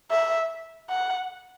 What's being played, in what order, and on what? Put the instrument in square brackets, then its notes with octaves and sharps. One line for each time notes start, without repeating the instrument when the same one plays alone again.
[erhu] E5
F#5